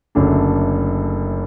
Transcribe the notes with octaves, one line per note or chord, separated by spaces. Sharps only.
F#1 F#2 D3 A3 D4